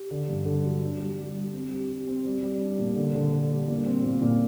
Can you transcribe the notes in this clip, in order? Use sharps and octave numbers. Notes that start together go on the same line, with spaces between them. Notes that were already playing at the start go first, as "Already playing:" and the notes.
Already playing: G4
D3
G2
D3
F#3
D4
G3
G3
G3
C4
G4
G4
C4
G3
G3
D4
A#2
D3
D3
D3
G3
A#2
C4
A#2
A#2